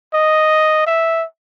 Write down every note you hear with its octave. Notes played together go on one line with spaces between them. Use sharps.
D#5
E5